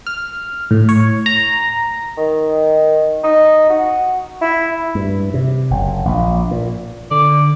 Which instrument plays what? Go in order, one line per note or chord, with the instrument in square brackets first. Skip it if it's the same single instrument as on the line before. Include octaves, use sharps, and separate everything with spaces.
[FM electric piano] F6
A2
C#5
A#5
[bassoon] D#3
D#4
F#4
E4
[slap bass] G2
C3
F#1
A#1
A#2
[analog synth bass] D3 [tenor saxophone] D5